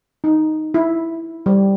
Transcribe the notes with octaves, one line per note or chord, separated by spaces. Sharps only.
D#4
E4
G3